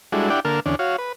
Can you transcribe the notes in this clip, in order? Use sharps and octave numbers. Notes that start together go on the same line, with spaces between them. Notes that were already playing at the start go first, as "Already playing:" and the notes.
G3 G#3 D4 E4 F#4 A4
D4 E4 G4 D5 F#5 G5
D3 A#3 A#4 A5 F6
E2 D3 C#4 D4
F#4 C#5 F5
B4